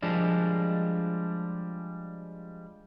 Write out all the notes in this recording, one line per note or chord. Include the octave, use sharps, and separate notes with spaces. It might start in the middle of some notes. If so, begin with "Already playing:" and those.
F3 G3 G#3 D4